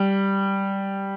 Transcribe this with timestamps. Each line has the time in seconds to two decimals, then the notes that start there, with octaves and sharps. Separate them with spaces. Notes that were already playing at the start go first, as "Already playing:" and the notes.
Already playing: G3